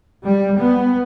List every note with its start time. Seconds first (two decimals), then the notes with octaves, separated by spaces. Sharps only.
0.25 G3
0.59 B3